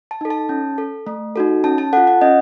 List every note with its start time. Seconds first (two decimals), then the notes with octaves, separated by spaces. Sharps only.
0.11 A5
0.21 D#4 A4
0.30 A5
0.49 C#4
0.78 A4
1.07 A3
1.36 D#4 F#4 A4
1.64 C#4 A5
1.78 A5
1.93 F4 A4 F#5
2.07 F#5
2.21 C#4 D#5